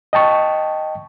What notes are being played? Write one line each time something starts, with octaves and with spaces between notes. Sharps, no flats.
D#5 G5 A5 C#6